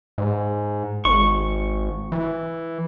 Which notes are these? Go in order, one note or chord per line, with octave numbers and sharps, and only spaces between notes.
G#2
G#1 C#6
E3